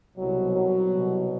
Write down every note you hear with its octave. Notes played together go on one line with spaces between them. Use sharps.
C2 B2 F#3
F#3
C2 B2